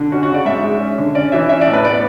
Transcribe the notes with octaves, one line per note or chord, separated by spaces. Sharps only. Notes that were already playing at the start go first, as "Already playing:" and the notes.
Already playing: D3
C#4 F#4
F#4
C#3
D5
G#2 E5
G#3
C#4
D3
C#4 D5
E3 E5
C#4 E5
D5
A2
B4
B3 D5